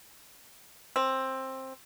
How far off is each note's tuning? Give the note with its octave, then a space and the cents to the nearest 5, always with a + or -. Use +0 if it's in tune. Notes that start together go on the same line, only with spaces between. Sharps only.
C4 +15